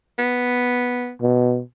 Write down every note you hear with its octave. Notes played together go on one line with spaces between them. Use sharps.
B3
B2